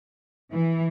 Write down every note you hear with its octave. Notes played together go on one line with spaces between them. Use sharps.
E3